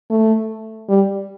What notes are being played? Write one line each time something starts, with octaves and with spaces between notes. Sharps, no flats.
A3
G3